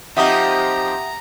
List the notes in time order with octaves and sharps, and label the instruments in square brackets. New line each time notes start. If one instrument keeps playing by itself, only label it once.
[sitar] F3 C4 D#4 [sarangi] G4 [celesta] E5 F#5 D#6 [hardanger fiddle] A#5